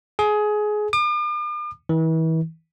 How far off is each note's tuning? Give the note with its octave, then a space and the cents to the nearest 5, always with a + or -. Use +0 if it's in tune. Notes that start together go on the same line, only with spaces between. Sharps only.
G#4 +20
D6 +45
E3 -35